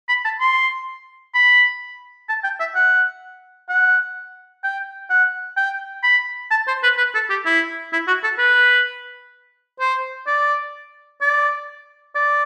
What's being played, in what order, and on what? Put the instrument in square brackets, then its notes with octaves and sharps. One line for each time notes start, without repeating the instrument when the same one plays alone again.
[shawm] B5
A5
C6
B5
A5
G5
E5
F#5
F#5
G5
F#5
G5
B5
A5
C5
B4
B4
A4
G4
E4
E4
F#4
A4
B4
C5
D5
D5
D5